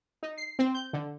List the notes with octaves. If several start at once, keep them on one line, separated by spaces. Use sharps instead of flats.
D#4
C7
C4
G6
D3